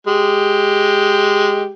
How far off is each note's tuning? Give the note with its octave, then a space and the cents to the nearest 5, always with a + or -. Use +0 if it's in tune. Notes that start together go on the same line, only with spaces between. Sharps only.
G#3 +0 G4 +0